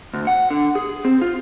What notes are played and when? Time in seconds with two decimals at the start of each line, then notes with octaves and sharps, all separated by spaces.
0.14 D2
0.27 F#5
0.50 D3
0.75 G#4
1.05 C4
1.21 F4